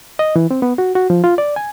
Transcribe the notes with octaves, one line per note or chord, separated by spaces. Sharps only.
D#5
E3
C4
B3
F#4
F#4
F3
F4
D5
G#5